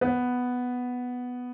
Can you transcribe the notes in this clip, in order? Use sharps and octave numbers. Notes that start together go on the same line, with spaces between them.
B3